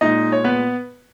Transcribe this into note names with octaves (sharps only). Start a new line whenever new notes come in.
A#2 G#3 D#4 D#5
C#5
B3 B4